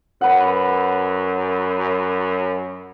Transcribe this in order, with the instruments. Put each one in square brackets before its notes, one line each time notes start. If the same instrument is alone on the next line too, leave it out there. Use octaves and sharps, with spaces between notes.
[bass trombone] F#2 [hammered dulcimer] B4 F#5